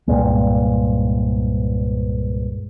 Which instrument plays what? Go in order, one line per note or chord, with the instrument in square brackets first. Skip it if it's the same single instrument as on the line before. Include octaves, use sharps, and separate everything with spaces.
[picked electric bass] C2 G2 A#2 G#3